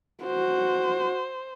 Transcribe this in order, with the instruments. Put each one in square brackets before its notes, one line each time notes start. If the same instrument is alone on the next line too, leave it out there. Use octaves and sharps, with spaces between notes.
[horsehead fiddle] F#4 [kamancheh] C5